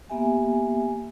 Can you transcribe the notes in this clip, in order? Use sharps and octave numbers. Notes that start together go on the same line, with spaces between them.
A#3 B3 G4 E5 G#5